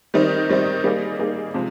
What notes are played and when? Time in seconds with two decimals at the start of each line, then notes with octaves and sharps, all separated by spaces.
0.14 D#3 G3 C4 D#4
0.49 D#3 G3 C4 D#4
0.84 G3 A#3 D#4 G#4
1.19 G3 A#3 D#4 G#4
1.54 C3 F3 G#3